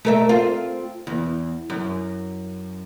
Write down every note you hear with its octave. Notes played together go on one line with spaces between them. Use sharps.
A3 A#4 E5
C4 F4
E2
F#2